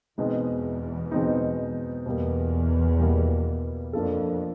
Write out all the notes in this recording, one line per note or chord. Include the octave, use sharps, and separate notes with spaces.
E2 B2 G#3 C4 D#4
B2 G#3 C4 D#4
E2 B2 G3 A#3
B2 G3 A#3
F2 A#3 D4 F4 A4